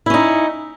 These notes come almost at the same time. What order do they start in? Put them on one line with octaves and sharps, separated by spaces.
E4 C#4 D#4